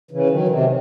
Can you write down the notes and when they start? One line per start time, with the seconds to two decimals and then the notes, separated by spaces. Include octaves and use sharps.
0.11 C#3 E3
0.30 D#3 F#3
0.48 C3 D#3
0.60 F#3